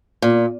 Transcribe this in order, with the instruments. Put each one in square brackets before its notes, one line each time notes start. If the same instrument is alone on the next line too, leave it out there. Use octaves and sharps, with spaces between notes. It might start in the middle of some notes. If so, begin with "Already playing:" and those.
[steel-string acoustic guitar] A#2